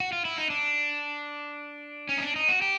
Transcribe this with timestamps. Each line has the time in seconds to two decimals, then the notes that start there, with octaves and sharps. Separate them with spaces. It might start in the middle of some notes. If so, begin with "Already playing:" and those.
0.00 F#4
0.12 F4
0.25 E4
0.38 D#4
0.50 D4
2.09 C#4
2.18 D#4
2.22 D4
2.36 D#4
2.49 F#4
2.62 G4